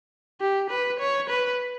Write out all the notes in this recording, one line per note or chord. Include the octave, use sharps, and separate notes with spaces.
G4
B4
C#5
B4